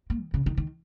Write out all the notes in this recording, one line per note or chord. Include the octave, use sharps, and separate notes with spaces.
A#3
D#3
C#3
D#3
D#3